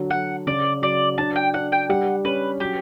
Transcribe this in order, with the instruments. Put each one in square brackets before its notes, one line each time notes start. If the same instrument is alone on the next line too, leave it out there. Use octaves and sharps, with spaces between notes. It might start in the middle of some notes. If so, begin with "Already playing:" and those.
Already playing: [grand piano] D3 F#3
[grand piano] F#3 [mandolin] F#5
[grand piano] C#3 [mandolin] D5
[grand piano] F#3 [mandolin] D5
[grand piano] D4 [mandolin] A5
[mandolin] G5
[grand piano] D4 [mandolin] F#5
[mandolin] G5
[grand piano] G3 [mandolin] F#5
[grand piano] C#4 [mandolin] B4
[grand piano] F#3 [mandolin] G4